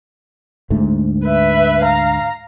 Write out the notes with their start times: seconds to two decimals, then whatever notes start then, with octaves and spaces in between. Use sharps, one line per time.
0.70 D2 G#2 A3
1.24 B4 E5
1.82 F5 A#5